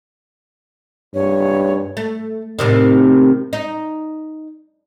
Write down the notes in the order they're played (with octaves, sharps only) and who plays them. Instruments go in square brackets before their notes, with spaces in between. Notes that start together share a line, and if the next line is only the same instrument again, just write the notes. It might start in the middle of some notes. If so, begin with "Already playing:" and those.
[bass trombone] G2 [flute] C#5
[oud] A3
A2 C3 D#3
D#4